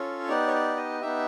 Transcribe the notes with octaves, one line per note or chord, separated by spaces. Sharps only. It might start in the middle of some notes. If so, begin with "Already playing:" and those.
Already playing: C#4 F4 A4 C#5
B3 D#4 G4 D5
C#5
D5
D#5
B3 D#4 G4 E5